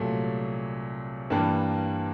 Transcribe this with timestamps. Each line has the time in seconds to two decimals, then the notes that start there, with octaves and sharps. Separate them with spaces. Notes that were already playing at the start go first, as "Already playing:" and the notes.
Already playing: C2 A#2 F#3 A3
1.30 G2 E3 G3 A#3 D4